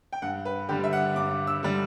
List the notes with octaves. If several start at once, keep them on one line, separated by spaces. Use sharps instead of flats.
G5
G2 F#5
B4
D3 G3 G4
E5
F#5
G2 D6
E6
D3 G3